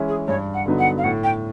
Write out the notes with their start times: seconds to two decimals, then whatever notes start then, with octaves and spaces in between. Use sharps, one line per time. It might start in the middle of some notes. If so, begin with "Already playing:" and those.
Already playing: E3 G#3 C#4 E4
0.08 G#4
0.28 G2 C#5
0.54 F#5
0.66 D3 F#3 B3 D#4
0.79 F#5
0.98 F5
1.04 A2 F#5
1.24 G5